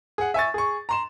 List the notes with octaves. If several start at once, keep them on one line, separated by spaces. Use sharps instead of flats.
G#4 F#5
E5 G#5 C#6 A6
G#4 C#6
A#5 C6 E7